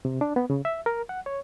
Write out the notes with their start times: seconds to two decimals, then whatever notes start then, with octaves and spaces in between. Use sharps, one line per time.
0.05 C3
0.21 D4
0.36 B3
0.50 C#3
0.65 E5
0.86 A#4
1.09 F#5
1.26 C#5